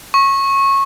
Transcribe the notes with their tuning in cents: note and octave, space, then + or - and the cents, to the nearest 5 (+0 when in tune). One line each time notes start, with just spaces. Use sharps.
C#6 -20